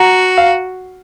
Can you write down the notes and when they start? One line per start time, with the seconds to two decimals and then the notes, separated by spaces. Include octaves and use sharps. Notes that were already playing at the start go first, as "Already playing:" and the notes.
Already playing: F#4 F#5 A#5
0.38 F5